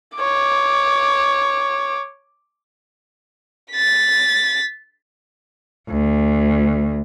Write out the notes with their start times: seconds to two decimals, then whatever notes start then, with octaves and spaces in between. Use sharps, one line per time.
0.18 C#5 D6
3.71 A6 B6
5.90 D2